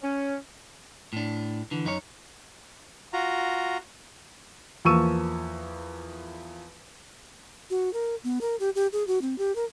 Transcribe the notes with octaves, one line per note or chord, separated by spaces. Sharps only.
C#4
A2 D4
D3 E3
F#2 D#4 F4 C#5
F4 F#4 A#5
E2 F3 A#3 C#6 E6 D#7
F#4
A#4
B3
A#4
G4
G4
G#4
F#4
C4
G4
A#4